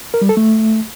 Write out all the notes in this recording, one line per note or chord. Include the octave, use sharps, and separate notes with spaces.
A#4
G3
A4
A3